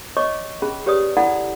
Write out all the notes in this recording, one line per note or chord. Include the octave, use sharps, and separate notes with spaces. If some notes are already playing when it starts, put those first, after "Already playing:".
C#5 D#5 C#6 D6
C#4 G#4 B5
G4 B4 C#5 D5 D#6
E4 A4 D5 F#5 B5